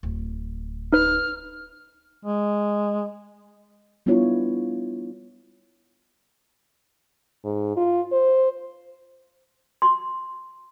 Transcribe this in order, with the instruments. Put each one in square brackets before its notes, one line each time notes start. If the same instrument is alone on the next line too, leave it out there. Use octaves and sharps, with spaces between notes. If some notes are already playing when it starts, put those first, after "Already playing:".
[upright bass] D1
[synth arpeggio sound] D#4 B4 [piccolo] F6
[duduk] G#3
[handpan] G3 B3 D4 E4 F4 C#5
[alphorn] G#2
F4
C5
[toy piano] C6